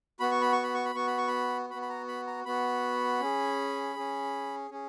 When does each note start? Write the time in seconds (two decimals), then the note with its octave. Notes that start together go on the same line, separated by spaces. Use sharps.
0.20 B3 F#4 B5
0.31 C#6
0.41 B5
0.52 C#6
0.63 B5
0.74 C#6
0.85 B5
0.95 B3 F#4 C#6
1.07 B5
1.18 C#6
1.28 B5
1.70 F#4 B5
1.75 B3
1.82 B5
1.89 A#5
2.08 B5
2.27 A#5
2.45 B3 F#4 B5
3.21 C#4 G#4
3.95 C#4 G#4
4.71 C#4 G#4